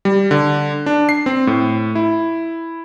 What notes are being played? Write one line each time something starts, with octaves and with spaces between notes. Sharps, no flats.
G3
D3
D4
C7
C4
A2
E4